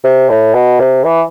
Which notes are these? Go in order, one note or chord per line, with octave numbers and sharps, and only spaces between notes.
C3
A2
B2
C3
E3